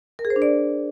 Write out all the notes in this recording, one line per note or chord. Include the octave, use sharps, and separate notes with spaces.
A#4
G#4
C5
D4
D5